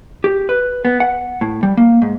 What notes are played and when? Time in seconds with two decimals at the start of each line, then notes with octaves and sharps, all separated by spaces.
0.24 G4
0.49 B4
0.85 B3
1.00 F#5
1.41 A2
1.63 G3
1.77 A#3
2.02 G#2